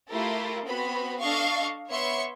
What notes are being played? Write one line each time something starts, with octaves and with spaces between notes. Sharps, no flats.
A3 E4 F4 G4 A4 A#4
B3 C4 F#4 B5
D4 A4 D#5 F5 C#6
B3 C#5 E5 C6 C#6 C#7